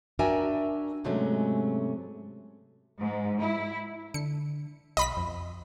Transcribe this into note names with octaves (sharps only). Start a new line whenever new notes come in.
D4 F#4 A#4 E5 G5 G#5
G#2 C3 F#3 G#3 A3 C#4
G#2
E4
D3 C#7
B1 D#5 B5 B6
F2